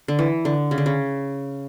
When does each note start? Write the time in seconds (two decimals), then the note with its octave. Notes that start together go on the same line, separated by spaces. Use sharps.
0.08 D3
0.19 E3
0.45 D3
0.71 C#3
0.78 D3
0.86 C#3